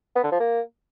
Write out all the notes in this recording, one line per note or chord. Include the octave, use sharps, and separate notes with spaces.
B3
D3
F3
A#3